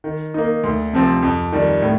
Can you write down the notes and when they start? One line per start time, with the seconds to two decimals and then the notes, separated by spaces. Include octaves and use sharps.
0.04 D#3
0.34 A#3 D#4
0.64 D2
0.93 C3 F3 C4
1.23 F2
1.52 D#3 G3
1.82 A2